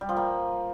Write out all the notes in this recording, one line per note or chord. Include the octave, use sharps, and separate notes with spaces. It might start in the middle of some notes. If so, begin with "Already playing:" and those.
G3
F3
A#3